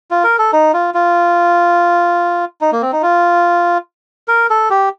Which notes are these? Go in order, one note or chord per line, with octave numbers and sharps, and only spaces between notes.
F4
A#4
A4
D#4
F4
F4
D#4
A#3
C4
D#4
F4
A#4
A4
G4